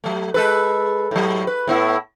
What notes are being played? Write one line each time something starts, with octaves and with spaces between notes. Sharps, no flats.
F#3 A3
G#3 A4 B4
A2 F#3
B4
A2 B3 E4